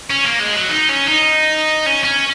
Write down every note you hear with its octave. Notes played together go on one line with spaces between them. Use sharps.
C#4
A#3
G#3
F#3
D#4
C#4
D#4
C#4
C#4